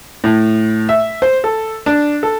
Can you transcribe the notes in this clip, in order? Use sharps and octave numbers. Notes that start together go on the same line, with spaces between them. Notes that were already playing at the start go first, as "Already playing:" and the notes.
A2
E5
C5
A4
D4
A4